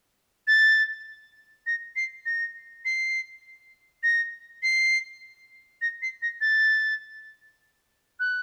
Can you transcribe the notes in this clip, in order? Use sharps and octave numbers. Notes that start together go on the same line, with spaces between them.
A6
A#6
C7
A#6
C7
A#6
C7
A#6
C7
A#6
A6
F#6